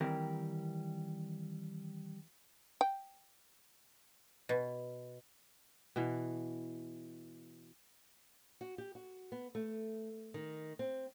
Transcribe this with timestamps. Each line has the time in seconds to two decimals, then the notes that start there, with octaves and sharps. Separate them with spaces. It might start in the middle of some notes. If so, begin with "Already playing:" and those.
0.01 D#3 E3 G3 C4 A#4
2.81 G5
4.49 B2
5.96 B2 E3
8.61 F#4
8.78 G4
8.95 F#4
9.32 B3
9.55 A3
10.34 D#3
10.79 C4